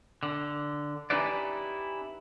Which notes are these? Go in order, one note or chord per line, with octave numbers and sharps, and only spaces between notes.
D3
C#4 D#4 E4 G4 B4 D5